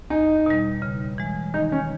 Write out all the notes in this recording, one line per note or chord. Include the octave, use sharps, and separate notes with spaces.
E2 D#4
B2 G3
C#3
E3 G#3
D#3 D#4
C#4